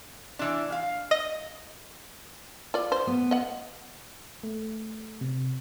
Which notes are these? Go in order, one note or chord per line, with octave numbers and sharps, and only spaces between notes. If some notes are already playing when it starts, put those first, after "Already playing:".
E3 D4
F5
D#5
F4 D5
C5
B3
D#5 F#5
A3
C3